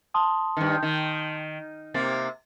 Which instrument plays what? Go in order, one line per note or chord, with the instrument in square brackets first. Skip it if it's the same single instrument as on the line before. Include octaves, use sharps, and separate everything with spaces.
[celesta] A5 C6 D#6
[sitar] G2 D#3
D#3
[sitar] C3 A#3 [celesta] A6